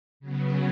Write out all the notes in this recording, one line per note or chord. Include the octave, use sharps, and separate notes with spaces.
C#3 F#3 B3